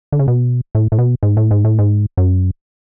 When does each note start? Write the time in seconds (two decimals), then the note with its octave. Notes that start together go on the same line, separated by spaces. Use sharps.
0.12 D3
0.19 C#3
0.28 B2
0.75 A2
0.92 A2
0.99 B2
1.23 G#2
1.37 A2
1.51 G#2
1.64 A2
1.79 G#2
2.17 F#2